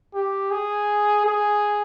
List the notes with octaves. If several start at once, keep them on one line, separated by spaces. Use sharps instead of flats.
G4
G#4
G#4